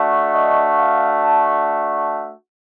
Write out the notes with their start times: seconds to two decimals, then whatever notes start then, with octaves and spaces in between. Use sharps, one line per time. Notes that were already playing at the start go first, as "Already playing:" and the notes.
Already playing: A3 D4 F#4
0.32 D#5
0.78 F5
1.23 A5